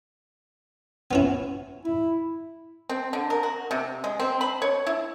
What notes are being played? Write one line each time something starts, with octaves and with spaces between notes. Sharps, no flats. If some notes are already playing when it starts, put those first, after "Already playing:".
B3 C#4 E4
E4
C4
D3
A#4
F#4
C3
G#3
C4
B5
C#5
E4